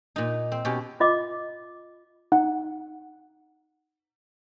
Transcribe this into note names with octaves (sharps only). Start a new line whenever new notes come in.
A#2 D#4
C4
B2 C#4 G4
F4 D#5 D6
D#4 F#5